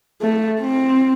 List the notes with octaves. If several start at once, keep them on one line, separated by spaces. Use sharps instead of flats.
A3
C4